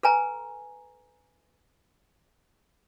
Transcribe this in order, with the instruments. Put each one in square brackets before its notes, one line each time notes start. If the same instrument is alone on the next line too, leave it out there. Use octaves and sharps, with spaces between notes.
[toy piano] A4 B4 G#5 A#5